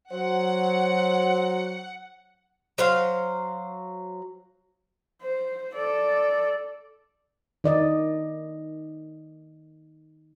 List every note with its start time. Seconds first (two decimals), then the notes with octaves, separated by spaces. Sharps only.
0.12 F#3 C5 F#5
2.78 F#3 C5 F5
5.22 C5
5.75 A4 D5
7.64 D#3 D5 D#5